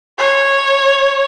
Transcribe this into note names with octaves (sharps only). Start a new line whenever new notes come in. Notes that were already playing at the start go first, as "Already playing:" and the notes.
C#5